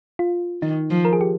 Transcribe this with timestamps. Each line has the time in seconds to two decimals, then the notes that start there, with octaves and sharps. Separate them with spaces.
0.19 F4
0.62 D#3 D#4
0.90 F3
1.05 A#4
1.13 G#4
1.21 G4